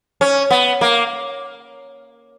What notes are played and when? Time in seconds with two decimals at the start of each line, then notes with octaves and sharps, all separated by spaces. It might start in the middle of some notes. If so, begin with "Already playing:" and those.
0.21 C#4
0.51 B3
0.81 A#3